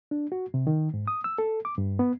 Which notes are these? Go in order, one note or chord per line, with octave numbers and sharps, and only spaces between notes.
D4
F#4
C3
D#3
G#2
D#6
E6
A4
D6
G2
B3